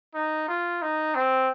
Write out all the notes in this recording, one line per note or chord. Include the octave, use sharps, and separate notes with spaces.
D#4
F4
D#4
C4